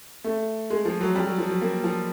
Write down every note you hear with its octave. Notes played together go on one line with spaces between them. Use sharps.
A3
G#3
F3
F#3
G3
F#3
F3
F#3
A#3
F3